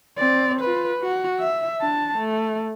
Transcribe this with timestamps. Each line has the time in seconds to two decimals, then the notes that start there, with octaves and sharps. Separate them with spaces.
0.18 C4 D5
0.61 F4 B4
1.02 F#4
1.39 E5
1.81 D4 A5
2.18 A3